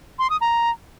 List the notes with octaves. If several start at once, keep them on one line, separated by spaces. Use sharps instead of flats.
C6
D#6
A#5